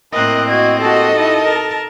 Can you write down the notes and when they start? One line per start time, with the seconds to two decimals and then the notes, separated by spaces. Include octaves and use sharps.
0.13 A2 A#3 C4 A#4 D#5 F#6
0.49 F#4 D#5 G#6
0.81 F#4 G4 A4 D#5
1.12 D#4 E4
1.43 A#4 A5